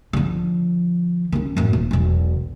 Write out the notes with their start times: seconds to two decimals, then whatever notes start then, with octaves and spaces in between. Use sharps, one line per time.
0.13 D3 F3
1.32 D#3 C#4
1.57 F#2 A2
1.73 D#1
1.91 E1 B1